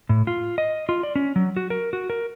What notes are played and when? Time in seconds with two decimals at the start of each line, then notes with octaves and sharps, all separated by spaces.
0.09 A2
0.27 F4
0.58 D#5
0.89 F4
1.03 D5
1.16 C#4
1.36 F#3
1.57 F#4
1.70 A#4
1.93 F#4
2.10 A#4